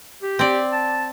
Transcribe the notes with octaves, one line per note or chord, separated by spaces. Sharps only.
G4
C4 D5
A5